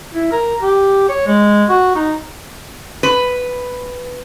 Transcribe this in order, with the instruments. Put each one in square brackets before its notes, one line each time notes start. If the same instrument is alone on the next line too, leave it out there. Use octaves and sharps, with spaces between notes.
[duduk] E4
A#4
G4
C#5
G#3
F#4
D#4
[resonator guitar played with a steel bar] B4